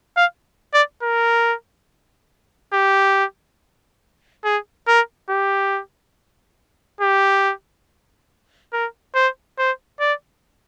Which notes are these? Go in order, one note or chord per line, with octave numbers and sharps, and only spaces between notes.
F5
D5
A#4
G4
G#4
A#4
G4
G4
A#4
C5
C5
D5